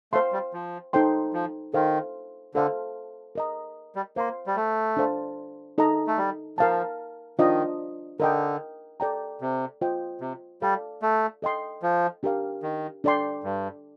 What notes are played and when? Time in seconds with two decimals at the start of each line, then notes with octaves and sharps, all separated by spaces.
0.13 A3 C5 F5 C6
0.32 G3
0.54 F3
0.93 D#4 A4 C5 G5 C6
1.33 F3
1.74 D#3 A4 C5 F5
2.55 D3 A4 C5 F5
3.35 A#4 D#5 A#5
3.95 G3
4.16 A#3 C5 F5 C6
4.47 G3
4.56 A3
4.97 D4 A4 C5 F5 A5
5.78 D#4 A4 D#5 A#5
6.07 A3
6.18 G3
6.58 F3 A#4 F5 A5
7.39 D#3 D4 F4 C5 D#5
8.20 D3 A#4 D#5 G5
9.00 A4 D5 G5 A#5
9.41 C3
9.81 F4 C5 D#5 G5
10.21 C3
10.62 G3 A4 D5 F5 A5
11.02 A3
11.42 A4 D#5 G5 C6
11.83 F3
12.23 D4 G4 A#4 F5
12.63 D#3
13.04 D4 A4 D5 G5 C6
13.44 G2